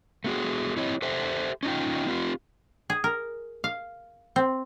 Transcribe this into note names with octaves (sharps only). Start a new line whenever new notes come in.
A3 B3 F#4 G#4
C4 E4 G4 C#5 D#5
G4 A4 C5 E5 G5
C#4 D#4 F4 G5
C4 F4 G4
G#4
A#4
F5
C4